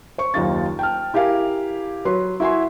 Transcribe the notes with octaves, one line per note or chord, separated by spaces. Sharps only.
C5 C#6
F#1 D#2 D#4 F4 A6
G5 A5 F6
E4 G4 A#4 F5 G#5
F#3 B4 C6
E4 F#4 E5 G#5 C6